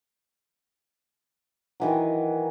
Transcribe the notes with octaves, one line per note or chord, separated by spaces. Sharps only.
D#3 E3 F#3